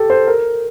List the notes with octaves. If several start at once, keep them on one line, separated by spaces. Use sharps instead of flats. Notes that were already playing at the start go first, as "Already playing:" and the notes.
Already playing: G4 A4
C5
A#4